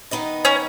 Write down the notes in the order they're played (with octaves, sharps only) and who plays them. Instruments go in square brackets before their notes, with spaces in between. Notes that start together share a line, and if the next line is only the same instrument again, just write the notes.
[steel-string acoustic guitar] D#3 B3 D#4 B4 D#5
[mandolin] C#4